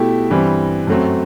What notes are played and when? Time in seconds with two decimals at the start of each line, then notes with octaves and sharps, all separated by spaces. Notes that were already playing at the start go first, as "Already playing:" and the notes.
Already playing: B2 A3 E4 G4
0.30 G2 E3 G3 C4
0.87 F#2 F#3 A3 C4